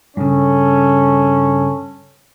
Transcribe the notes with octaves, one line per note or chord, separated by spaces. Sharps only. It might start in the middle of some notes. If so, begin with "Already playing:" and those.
G2 C#3 C#4 A4